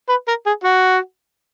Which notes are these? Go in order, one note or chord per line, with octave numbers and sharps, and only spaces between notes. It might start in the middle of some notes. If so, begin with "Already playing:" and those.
B4
A#4
G#4
F#4